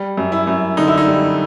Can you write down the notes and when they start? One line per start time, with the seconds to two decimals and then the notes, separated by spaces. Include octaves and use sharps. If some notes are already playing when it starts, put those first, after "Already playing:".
Already playing: G3
0.17 F#2
0.32 E4
0.47 F#2
0.77 D3 D#4
0.88 E4
0.97 D#4
1.07 G3